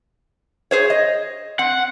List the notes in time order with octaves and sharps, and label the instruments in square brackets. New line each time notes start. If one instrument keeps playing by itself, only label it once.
[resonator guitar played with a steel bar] G#4 C5 C#5
D#5
[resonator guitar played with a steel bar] C4 [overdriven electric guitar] F#5